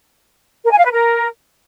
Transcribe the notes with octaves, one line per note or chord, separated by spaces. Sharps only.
A#4
G#5
F5
B4
A#4